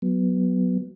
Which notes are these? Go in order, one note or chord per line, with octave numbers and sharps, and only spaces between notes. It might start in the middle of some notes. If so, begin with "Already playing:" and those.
F#3 B3